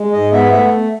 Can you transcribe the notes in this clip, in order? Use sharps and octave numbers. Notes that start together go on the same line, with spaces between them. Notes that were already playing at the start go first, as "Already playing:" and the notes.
Already playing: G#3
G#2 D#5
B3 E5
A3 E5